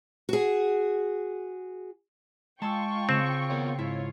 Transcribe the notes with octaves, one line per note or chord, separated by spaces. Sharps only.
F#4 G#4
G#3 F4 G5 A5 C6 C#6 E6
C#3 C4 E7
B3 A#4 C#5
G#2 E4 F4 C#5